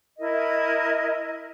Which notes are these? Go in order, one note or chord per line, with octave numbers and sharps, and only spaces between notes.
E4 A#4 D#5